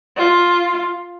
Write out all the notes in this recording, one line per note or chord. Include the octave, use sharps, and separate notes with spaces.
F4